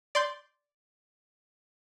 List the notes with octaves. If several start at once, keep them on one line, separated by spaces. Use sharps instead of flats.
D5 C6 G6